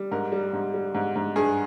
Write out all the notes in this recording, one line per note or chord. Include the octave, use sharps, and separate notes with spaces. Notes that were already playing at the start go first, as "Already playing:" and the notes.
Already playing: G3
G#2 A#4
G3
G#2
G3
G#2
G#2
G2 G#4